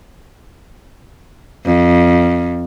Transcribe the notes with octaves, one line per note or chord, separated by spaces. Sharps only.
F2